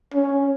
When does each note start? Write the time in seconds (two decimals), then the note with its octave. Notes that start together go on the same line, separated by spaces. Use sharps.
0.14 C#4